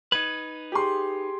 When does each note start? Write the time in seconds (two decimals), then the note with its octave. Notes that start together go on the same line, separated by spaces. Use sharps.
0.12 D#4 B4 G#6
0.72 G4 G#4 C6